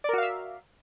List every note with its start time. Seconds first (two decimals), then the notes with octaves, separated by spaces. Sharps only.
0.04 D5
0.09 A#4
0.13 F#4
0.18 F5
0.23 E5